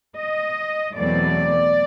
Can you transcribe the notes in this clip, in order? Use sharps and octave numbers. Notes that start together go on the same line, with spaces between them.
D#5
E2 B2 F#3 A3 C4 D5